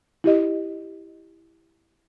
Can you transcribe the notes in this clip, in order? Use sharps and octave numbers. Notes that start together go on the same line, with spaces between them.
E4 G4 D#5